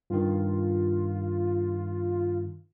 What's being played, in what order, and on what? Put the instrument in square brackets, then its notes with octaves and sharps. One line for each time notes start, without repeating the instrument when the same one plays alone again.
[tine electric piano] G2 D#3 [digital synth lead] F4